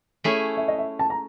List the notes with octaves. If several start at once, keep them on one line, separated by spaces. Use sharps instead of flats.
A3 C#4 E4 G#4
E5
D#5
E5
A5
A#5